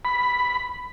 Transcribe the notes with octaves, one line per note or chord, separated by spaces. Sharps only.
B5